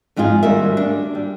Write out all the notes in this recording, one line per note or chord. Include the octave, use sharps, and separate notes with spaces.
F2 G#2 D#4 F4 G#4
D#2 G3 F#4 A#4 E5
D4
G3